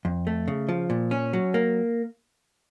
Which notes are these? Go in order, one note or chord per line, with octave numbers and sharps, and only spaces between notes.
F2
A3
C#3
F3
A#2
C#4
F#3
A#3